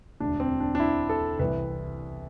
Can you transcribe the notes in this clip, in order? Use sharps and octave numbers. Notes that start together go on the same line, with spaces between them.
E1 D2 D3 D4
C4
D4
D4
E4
A4
C2 C3 E3 B4